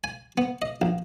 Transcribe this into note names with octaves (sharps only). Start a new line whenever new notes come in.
G#5
B3
D#5
A#1